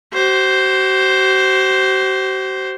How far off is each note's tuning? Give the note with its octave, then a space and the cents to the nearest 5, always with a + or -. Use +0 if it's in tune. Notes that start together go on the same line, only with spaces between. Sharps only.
F#4 +45 C5 +0